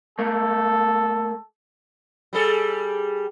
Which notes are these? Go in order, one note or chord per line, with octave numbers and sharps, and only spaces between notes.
A3 A#3 A4
G3 G#4 A4